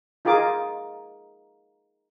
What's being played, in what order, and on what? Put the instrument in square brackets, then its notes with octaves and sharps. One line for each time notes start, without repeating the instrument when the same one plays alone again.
[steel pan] D#4 F4 G#4 A#4 D6